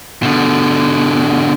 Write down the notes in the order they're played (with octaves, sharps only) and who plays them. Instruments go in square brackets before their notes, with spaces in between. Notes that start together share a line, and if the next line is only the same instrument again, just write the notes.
[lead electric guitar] B2 D3